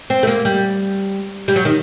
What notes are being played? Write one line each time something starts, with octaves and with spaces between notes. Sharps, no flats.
C4
A3
A#3
G3
G3
F#3
D#3